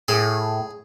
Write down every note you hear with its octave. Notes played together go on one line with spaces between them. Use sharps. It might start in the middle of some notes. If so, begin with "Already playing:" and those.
A2 G#4